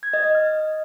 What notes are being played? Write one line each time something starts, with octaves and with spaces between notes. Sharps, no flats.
G#6
D#5
D#5
F6